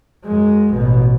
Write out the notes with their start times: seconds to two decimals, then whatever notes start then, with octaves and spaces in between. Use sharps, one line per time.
0.24 F#2 G#3
0.74 A1 B2